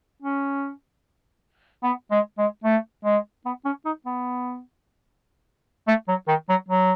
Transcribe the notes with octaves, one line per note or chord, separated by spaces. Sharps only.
C#4
B3
G#3
G#3
A3
G#3
B3
C#4
D#4
B3
A3
F#3
D#3
F#3
F#3